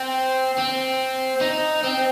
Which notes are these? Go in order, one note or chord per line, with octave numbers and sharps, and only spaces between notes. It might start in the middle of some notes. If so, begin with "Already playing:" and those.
Already playing: C4
C4
D#4
C4